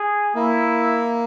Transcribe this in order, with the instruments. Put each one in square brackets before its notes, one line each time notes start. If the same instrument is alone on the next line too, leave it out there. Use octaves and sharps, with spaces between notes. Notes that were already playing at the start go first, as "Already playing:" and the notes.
Already playing: [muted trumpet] G#4
[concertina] A#3 [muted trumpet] E4